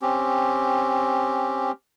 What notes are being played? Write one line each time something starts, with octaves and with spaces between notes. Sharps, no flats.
C4 C#4 G4